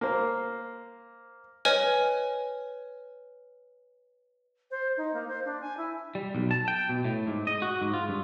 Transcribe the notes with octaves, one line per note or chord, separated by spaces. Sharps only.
A#3 C5
B4 C#5 D#5 G#5 F6
C5
D#4
A#3
C5
D4
G#5
E4
G3
B1
A5
G5
B2
A2
G#2
D#5
F#4
G#2
F4
G2